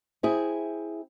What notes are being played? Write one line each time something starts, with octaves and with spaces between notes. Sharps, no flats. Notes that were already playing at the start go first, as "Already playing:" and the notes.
C4 E4 G#4